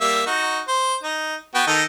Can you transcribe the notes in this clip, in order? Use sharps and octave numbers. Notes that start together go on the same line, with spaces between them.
G3 A#3 E5
D#4 F#4
C5
D#4
B3 F#4 G5
D#3 D#4 A4